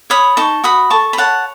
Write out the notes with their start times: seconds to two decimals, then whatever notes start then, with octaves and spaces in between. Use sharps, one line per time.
0.10 C#5 B5 D#6
0.37 D#4 A5 C#6
0.64 F#4 B5 D#6
0.90 A4 A5 C#6
1.13 B5
1.17 C#5 F#5 A5